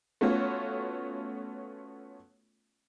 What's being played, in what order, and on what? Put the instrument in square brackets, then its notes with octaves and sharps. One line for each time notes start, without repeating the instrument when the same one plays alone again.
[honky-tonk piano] A3 B3 C#4 F4 F#4 C#5